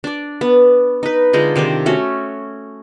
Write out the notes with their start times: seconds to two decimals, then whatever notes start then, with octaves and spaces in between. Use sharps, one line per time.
0.04 D4 D5
0.41 B3
1.03 D#4 B4
1.33 D3 G#3 D#4 F4
1.56 C3 D#3 D4 C5
1.86 A3 C#4 F#4